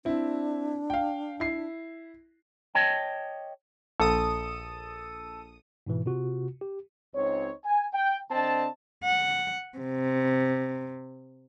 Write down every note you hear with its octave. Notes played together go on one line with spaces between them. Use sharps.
C4 D4 E4
F5 G5
E4 C7
C#5 D#5 G5 A5
A#1 A4 D#6 D#7
G#2 B2 E3
C3 F4 F#4
G4
C#2 C4 D#4 C#5
G#5
G5
D3 C4 D4 D#5 A5
F#5
C3